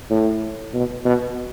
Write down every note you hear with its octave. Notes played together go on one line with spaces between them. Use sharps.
A2
B2
B2